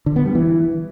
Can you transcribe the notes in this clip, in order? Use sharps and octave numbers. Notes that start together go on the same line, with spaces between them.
D3
B3
G3
E3